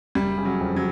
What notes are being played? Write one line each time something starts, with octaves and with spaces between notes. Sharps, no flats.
F#1 G3
C#3
F#3
F2
F#3